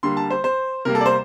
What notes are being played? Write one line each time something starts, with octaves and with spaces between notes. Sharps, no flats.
D3 G3 A#3 C6
A5
C5
C5
C3 G3 A#3 A#4
A4
D5
C5